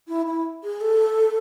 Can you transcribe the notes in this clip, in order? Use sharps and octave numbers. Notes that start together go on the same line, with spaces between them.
E4
E4
G#4
A4